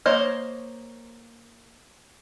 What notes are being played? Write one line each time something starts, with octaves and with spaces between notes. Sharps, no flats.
A#3 C5 C#5 D#5